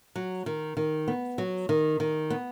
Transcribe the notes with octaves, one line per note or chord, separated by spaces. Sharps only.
F#3
D#3
D#3
B3
F#3
D#3
D#3
B3